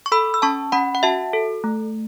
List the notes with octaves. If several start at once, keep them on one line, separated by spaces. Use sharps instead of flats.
C#6
A4 B5 E6
E6
C#4 A5 C#6
C#4 F#5 B5
F#5
F#4 E5 A5
A4
A3